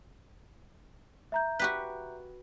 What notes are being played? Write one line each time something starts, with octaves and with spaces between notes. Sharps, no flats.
E5 A#5 G6
F#4 G4 B4